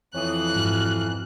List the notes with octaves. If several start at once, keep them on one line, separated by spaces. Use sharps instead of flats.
F2 E3 C#5 D#6 F#6
G#2 F#4 F6